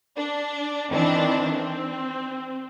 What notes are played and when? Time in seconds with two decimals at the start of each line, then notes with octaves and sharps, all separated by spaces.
0.18 D4
0.91 D#3 E3 C4 D4
1.55 C4